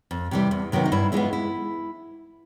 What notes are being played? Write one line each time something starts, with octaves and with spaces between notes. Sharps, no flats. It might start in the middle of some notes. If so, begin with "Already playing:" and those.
F2
C3 E3 G3
E2
C3 D#3 F#3 B3
D#4
G2 E4
E3 G#3 B3 F4
E4